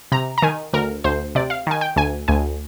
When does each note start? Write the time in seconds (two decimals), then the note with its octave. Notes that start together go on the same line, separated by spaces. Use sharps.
0.12 C3 A#5
0.38 A#5
0.42 D#3 G#5
0.73 D2 A#4
1.04 D2 C5
1.35 C3 D5
1.50 F5
1.67 D#3 G#5
1.81 G5
1.96 D2 G#5
2.28 D2 G#5